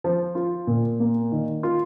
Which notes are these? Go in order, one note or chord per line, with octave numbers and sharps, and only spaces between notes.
F3
F4
A#2
A#3
D#3
F4